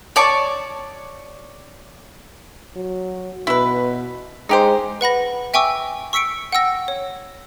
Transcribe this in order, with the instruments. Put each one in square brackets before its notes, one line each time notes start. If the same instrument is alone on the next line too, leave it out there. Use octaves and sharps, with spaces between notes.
[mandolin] C#5 D5 A5 D6
[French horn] F#3
[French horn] B2 [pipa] E4 B4
[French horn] G#3 [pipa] D#4 G4 C5
[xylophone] B4 F#5 B5 A#6
E5 G5 G#5 C#6 D6 E6
C#6 E6 B6 C#7 D7
F#5 G5 E6 A#6
C#5